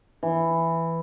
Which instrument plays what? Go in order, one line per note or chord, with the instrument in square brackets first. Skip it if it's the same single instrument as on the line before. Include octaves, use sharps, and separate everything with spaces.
[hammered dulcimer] E3